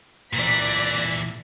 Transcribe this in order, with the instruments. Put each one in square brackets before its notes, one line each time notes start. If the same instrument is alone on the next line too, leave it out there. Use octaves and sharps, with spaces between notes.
[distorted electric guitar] A#2 E3 [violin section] D5 A#6 B6